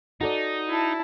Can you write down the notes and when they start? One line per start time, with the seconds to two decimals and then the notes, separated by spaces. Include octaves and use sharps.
0.21 D#4 F#4 A4 D5
0.69 E4 A5